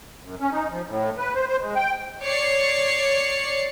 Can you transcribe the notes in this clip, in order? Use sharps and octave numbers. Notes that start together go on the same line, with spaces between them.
F#2
C#4
D#4
F3
A2
B4
C5
C5
G#3
G5
C#5 D5 C7 C#7